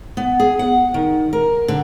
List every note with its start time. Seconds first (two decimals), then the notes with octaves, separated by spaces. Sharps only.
0.17 B3
0.40 G#4
0.59 F#5
0.94 D#3
1.33 A#4
1.68 D3